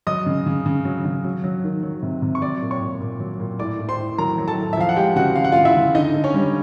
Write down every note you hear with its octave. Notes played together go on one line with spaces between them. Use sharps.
F#3 D#5 D#6
C#3
C#3
C#3
F#3
C#3
F#3
F#3
D#3
F#3
C3
C3
C#6
F#3 D5 D6
A#2
C#5 C#6
A#2
A#2
F#3
A#2
A2 D5 D6
A2
C5 C6
A2
F#3 A#4 A#5
F#3
A4 A5
A2
E5
F3 F5
F#5
G#3 G4 G5
C#3 F#4 F#5
C#3 F5
F#5
C#3 F4 F5
E4 E5
C#3
D3 D#4 D#5
D3
C#4 C#5
G3